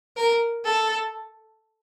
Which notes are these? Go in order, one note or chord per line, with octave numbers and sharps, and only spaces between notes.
A#4
A4